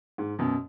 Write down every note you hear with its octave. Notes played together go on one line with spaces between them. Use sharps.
G#2
F#2 B2